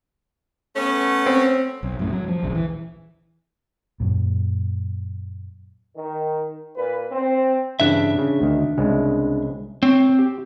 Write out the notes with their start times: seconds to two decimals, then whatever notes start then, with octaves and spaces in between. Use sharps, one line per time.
0.75 A3 B3 C#4
1.26 C4
1.83 B1
1.99 F#2 A2
2.13 F#3
2.28 F3
2.43 A#1 D#2
2.55 E3
4.00 F#2 A#2
5.96 D#3
6.76 A#2 B4
7.11 C4
7.80 G2 C#3 E3 D4 E5
8.18 C#3
8.40 D2 D#3
8.78 C2 C#3 G#3
9.83 C4 C#5
10.19 G4